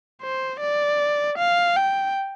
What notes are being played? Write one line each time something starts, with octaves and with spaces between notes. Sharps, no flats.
C5
D5
F5
G5